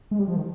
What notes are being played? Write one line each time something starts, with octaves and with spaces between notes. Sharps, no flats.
G#3
G3
F3
D#3